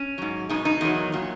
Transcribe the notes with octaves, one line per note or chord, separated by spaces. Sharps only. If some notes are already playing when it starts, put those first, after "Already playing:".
Already playing: C#4
G#2 F#3
B2 G#3 D#4
D#4
E2 D#3 F#3
A#2 F#3